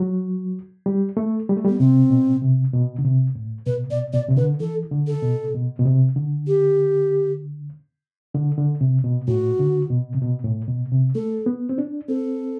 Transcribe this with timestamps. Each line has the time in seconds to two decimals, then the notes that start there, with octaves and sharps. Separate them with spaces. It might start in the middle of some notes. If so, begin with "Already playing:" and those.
Already playing: F#3
0.86 G3
1.17 A3
1.49 G3
1.57 A3
1.65 G3 B3
1.80 C3 C4
2.10 B2
2.42 C3
2.73 B2
2.99 D3
3.04 C3
3.35 A2
3.67 B2 B4
3.90 B2 D5
4.13 B2 D5
4.29 C3
4.37 D3 B4
4.60 E3 A4
4.91 D3
5.07 A4
5.22 B2
5.54 B2
5.79 B2
5.86 C3
6.16 D3
6.47 G4
8.34 D3
8.57 D3
8.81 C3
9.04 B2
9.28 A2 F#4
9.59 D3
9.90 B2
10.15 C3
10.22 B2
10.44 A2
10.68 B2
10.92 C3
11.15 A3 A4
11.46 B3
11.69 C4
11.78 D4
12.08 C4 A4